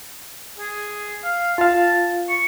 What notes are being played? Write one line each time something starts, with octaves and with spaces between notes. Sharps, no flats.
G#4
F5
F4 F5 A5
C#6